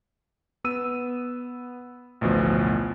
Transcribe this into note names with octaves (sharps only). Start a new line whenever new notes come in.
B3 E6 D#7
A1 D2 B2 F3